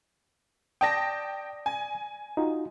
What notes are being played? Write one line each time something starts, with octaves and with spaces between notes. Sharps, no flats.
D5 G5 A5 D#6 A#6
G#5
D#4 F4 F#4